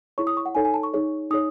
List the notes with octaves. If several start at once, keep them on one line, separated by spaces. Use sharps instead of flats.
E4 G#4 C#5 C#6
D#6
C#6
F#5
D#4 A4 C#5 G#5
G#5
A5
C#6
D#4 G#4 C#5
D#4 G#4 C#5 D#6